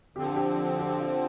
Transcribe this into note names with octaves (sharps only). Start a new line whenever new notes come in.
D3 F3 C4 G4
A4
G4
G4
F4